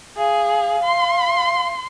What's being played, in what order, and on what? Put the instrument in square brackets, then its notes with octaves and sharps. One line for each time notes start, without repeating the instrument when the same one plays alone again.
[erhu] G#4 [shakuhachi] F5
[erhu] C6